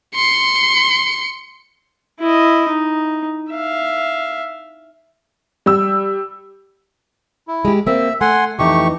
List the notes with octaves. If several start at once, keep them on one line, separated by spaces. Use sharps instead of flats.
C6 C#7
E4 D#5
D#4
E5 F5
G3 E6
E4
G#3 G4
A#3 C4 E5
A3 F#5 G#5 C6
F2 E3 A3 D#4 G4 C#6